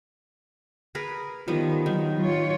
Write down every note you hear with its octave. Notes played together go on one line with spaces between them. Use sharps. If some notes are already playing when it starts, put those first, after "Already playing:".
G#4 A#4 B4
D#3 F3 G3 B3
D#3 F#3
F4 C#5